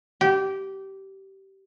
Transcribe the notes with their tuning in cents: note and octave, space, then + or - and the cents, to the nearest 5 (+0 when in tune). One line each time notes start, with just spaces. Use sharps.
G4 -20